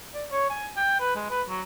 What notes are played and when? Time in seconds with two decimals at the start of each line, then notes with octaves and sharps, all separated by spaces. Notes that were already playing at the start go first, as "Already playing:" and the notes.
0.14 D5
0.31 C#5
0.50 G#5
0.76 G5
1.00 B4
1.15 G#3
1.30 B4
1.49 F#3